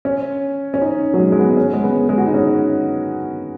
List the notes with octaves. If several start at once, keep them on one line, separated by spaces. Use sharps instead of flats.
C#4
C#4
D#4
F#3
G#3
G#3
B3
C#4
G#3
B3
G#3
F#4
D#4
C#4